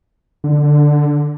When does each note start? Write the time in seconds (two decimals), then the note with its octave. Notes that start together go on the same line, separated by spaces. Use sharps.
0.44 D3